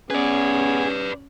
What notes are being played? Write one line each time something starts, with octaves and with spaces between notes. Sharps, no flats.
B3 C#4 G#4 B4 D5